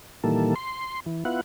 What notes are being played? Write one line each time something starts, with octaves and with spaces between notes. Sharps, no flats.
A#2 D#3 E3 G3 A#3 A4
C6
E3
B3 E4 F4 F#5